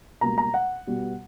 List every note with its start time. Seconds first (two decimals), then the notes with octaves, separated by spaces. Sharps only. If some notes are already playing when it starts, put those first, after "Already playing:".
0.21 C#2 B2 G3 A#3 A#5
0.38 A#5
0.54 F#5
0.87 B2 G3 B3